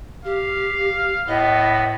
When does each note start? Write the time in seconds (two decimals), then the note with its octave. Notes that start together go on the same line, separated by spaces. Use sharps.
0.25 G4 F5
1.28 A2 B3 D#5